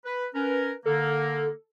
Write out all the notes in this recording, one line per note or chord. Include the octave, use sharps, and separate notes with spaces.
B4
C#4 A#4 B4
D3 A#3 A4